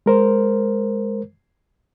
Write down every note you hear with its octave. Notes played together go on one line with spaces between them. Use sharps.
G#3 A#4 C5